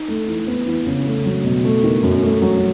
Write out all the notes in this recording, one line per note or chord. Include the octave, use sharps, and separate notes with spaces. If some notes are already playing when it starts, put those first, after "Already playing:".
Already playing: D#4
A3
E3
B3
E3
C#3
A3
F#3
B2
A3
D#3
F#2
A3
F#3